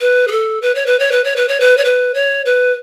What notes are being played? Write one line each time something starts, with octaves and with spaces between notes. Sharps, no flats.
B4
G#4
A4
B4
C#5
B4
C#5
B4
C#5
B4
C#5
B4
C#5
B4
C#5
B4